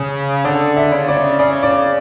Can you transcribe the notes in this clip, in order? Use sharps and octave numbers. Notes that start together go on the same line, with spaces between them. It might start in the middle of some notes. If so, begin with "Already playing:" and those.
Already playing: C#3
D3 D5
E5
C#3
D5
C#3 D5
D5